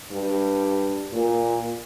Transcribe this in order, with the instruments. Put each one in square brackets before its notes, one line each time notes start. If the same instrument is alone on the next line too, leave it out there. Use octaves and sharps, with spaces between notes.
[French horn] G2
A#2